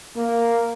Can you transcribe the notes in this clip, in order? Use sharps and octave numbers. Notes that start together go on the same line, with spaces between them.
A#3